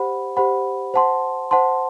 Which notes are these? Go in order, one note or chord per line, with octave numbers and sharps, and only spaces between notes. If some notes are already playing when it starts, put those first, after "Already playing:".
Already playing: G4 C5 F#5 B5
G4 C5 F#5 B5
C5 F#5 A5 C6
C5 F#5 A5 C6